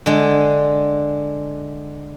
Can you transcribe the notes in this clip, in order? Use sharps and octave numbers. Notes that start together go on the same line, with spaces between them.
D3 G#3